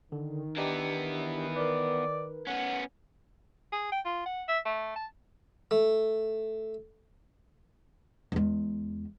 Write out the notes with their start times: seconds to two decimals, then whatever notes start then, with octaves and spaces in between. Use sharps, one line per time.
0.12 D3 D#3
0.57 E3 B3 D4 D#4 G4
1.56 A#4 B4 D5
2.47 B3 C#4 F#5
3.72 G#4
3.92 G5
4.05 F4
4.26 F#5
4.48 E5
4.65 A3
4.96 A5
5.71 A3
8.32 E2 G#3